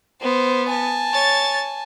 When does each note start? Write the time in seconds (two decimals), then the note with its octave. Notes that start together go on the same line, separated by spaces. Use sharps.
0.21 B3 C5
0.68 G#5 A5
1.13 C#5 A6